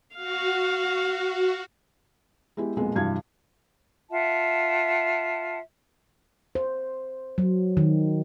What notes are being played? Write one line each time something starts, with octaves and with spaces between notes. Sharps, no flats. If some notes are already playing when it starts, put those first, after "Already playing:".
F#4 F5
G#3 B3 E4 G4
B1 F2 A#2 G#3 B3
F1 G2 E3 F#4 F5 G#6
F4 E5 F#5 A5
C5
F#3
D#3